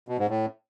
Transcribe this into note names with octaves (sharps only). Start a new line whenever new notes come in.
B2
G#2
A2